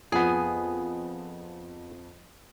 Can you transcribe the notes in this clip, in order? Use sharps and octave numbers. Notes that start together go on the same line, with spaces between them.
F2 B3 G#4 G#5